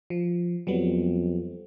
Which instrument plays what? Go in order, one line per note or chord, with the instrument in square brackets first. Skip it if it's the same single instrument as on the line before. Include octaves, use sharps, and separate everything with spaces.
[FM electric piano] F3
[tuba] F2 [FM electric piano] F#3 G3 B3